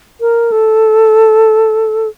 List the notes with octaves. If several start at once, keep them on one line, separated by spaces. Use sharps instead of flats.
A#4
A4